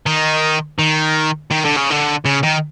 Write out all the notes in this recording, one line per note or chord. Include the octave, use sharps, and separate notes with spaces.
D#3
D#3
D#3
D3
C#3
D3
C#3
D#3